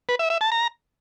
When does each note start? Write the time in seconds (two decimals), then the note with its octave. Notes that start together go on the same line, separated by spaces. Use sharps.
0.09 B4
0.19 E5
0.30 E5
0.41 A5
0.52 A#5